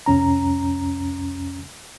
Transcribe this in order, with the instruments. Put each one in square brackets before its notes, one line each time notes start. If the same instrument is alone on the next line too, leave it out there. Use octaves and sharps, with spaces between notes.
[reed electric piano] C2 F2 C#4 A#5